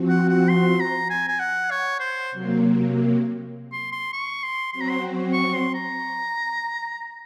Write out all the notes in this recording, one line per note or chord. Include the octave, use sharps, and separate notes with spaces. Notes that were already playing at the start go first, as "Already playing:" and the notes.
Already playing: F3 C4 F#4
F#5
F#5
C6
A#5
G#5
G#5
F#5
C#5
C5
C3 F#3 A#3
C6
C6
C#6
C6
F#3 C4 F#4 C6
A#5
C6
C#6
C6
A#5